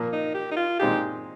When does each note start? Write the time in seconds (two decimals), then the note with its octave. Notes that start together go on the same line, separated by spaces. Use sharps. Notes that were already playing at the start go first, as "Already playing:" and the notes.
Already playing: A#2 F3 A#3
0.12 D#4
0.34 G4
0.51 D#4
0.56 F4
0.79 A#2 G#3 C4 D#4 G4 G#4